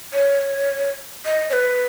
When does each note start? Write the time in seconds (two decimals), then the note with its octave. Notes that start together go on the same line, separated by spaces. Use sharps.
0.13 C#5
1.26 D#5
1.50 C#5
1.53 B4